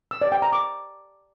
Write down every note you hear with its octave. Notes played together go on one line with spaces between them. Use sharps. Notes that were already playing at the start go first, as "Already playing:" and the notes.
E6
D5
G5
A#5
D6